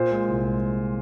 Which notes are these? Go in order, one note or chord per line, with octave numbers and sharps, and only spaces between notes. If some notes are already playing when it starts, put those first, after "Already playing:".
Already playing: A#2 C5
G#3
C2
G#3